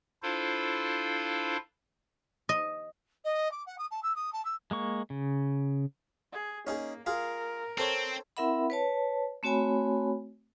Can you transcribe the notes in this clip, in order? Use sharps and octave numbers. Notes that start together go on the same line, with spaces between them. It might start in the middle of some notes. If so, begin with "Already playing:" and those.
D4 E4 F4 A4 C5 F5
D#5
D#5
D6
F#5
D#6
A5
E6
D#6
A5
E6
G#3 A#3 C#6
C#3
G#4
A#3 C#4 D#4 G#4
F4 G#4 A#4
C4 A4 C5 C#5
C4 E4 A#4 E5 F#5 B5
B4 C#5 A5
A3 C4 F#4 C#5 G#5 B5